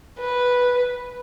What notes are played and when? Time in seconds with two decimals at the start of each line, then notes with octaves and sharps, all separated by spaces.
0.19 B4